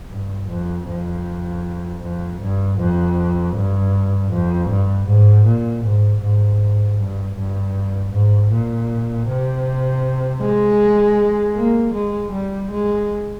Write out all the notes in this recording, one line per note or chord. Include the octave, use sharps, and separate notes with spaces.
G2
F2
F2
F2
G2
F2
G2
F2
G2
G#2
A#2
G#2
G#2
G2
G2
G#2
A#2
C3
G#3
A#3
G#3
G3
G#3